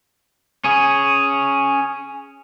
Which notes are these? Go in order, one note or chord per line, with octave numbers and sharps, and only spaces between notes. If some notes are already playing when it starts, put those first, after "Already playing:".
C#4 G#4